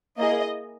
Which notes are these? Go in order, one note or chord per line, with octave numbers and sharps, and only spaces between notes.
A#3 E4 G#4 D#5